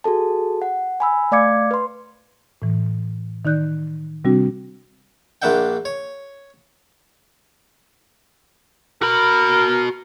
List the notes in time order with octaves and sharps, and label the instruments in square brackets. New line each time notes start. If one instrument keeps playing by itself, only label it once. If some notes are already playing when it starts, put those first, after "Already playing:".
[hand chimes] F#4 G#4 A4 A5
F#5
G#5 B5 E6
A3 D5 F5 D6 G#6 C#7
B4 C6
[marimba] A2 E3
D#3 D#4 D5 F#6 G6
C3 G3 C4 D4 F#4
[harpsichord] A#1 A#3 D4 E5 F#5 G5
C#5
[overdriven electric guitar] F#4 B5 [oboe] A#4